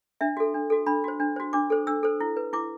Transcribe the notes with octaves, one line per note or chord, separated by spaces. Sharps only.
D4 E5
F#4 A4
D4
F#4 A4
D4 B5
F#4 C5
D4
F#4 C5
D4 D6
A4 C5
D4 E6
A4 C5
E4
B4
E4 D6